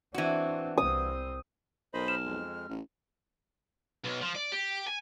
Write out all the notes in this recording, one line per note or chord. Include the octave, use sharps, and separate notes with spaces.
E3 C4 D4 F#4
C2 C4 D#6
B1 A#4 C5 D#5 B5
F6 E7
F2 G#3
A1
B1
F3
D5
G4
G#5